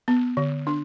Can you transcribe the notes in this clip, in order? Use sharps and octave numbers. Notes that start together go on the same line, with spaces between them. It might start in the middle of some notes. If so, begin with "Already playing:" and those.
B3
D3
D4